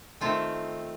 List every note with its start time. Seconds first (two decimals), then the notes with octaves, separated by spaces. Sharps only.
0.21 D#3 A3 C4 F4